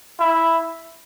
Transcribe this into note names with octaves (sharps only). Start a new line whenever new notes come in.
E4